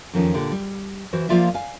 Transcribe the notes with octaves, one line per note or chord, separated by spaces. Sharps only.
F2 D#3 F3 C#4
A#2 D3 G4
G3
E3 F#4 C5
F3 G#3 A#3 F4 D5 E5
F5 G#5